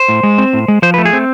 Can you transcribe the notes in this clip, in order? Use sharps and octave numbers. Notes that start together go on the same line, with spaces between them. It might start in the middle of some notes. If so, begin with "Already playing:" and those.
Already playing: C5
A2
G#3
C4
A2
G#3
F3 C5
A3 B4
G#4
C4